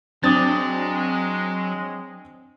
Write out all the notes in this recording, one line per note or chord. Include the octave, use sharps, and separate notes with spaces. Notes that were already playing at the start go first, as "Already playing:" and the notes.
F#3 G#3 C4 D4 D6 D#6 A6